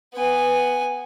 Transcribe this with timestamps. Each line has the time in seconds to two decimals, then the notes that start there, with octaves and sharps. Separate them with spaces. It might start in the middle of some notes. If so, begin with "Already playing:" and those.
0.14 B3 G#5